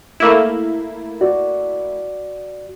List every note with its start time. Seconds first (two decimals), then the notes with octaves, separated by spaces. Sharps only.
0.20 A3 A#3 E4
1.21 F#4 D5